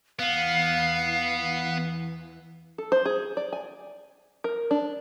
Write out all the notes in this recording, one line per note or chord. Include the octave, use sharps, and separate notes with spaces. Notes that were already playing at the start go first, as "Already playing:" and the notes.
E2 E3 B3 F5
A4
C5
G#4
D5
G#5
A#4
D4